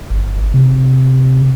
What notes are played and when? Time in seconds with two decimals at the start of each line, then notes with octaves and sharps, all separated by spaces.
0.10 G1
0.54 C3